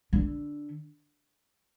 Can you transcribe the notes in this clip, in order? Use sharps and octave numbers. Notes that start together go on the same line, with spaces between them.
D3